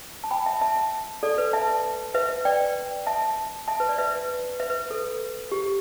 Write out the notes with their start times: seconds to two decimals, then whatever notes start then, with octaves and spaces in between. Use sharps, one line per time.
0.24 A5
0.31 G5 B5
0.46 E5 A5
0.61 E5 A5
1.23 A4 D5
1.38 B4
1.53 E5 A5
2.14 B4 E5
2.45 D5 G5
3.07 E5 A5
3.68 E5 A5
3.80 B4
3.89 D5
3.98 B4 E5
4.60 B4 E5
4.70 B4
4.90 A4
5.52 G4